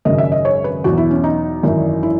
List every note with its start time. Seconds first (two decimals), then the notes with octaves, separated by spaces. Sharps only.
0.05 G#1 F#2 C#3 D#5
0.18 E5
0.32 D#5
0.45 C#5
0.64 B4
0.84 E2 B2 F#3 F#4
0.98 E4
1.11 C#4
1.24 D#4
1.63 G#1 F#2 E3
2.03 E4